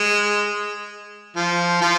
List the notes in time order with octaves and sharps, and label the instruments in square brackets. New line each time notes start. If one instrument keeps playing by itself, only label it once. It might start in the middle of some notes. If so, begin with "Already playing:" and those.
Already playing: [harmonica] G#3
F3
F3